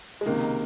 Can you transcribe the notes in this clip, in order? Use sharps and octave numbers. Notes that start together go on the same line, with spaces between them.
G#3
C#2 C3 D#3 A#3